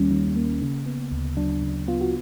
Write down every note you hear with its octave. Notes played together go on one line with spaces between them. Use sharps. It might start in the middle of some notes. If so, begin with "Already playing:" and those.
Already playing: D#2 D#3 G3 A#3 C#4
D#3
A#3
C#3
B3
D2
F#3 D4
C#3
B3 F4
F#4